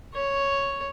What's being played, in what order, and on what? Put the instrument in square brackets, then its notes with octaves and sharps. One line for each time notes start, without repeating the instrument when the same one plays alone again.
[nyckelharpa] C#5